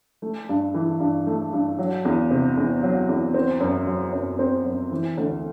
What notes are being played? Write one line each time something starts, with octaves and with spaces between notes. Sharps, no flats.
A3
G2
E3
G2
A3
G2
F#3
E2
C3
E2
F#3
E2
C4
F#2
F#3
F#2
C4
F#2
E3
D2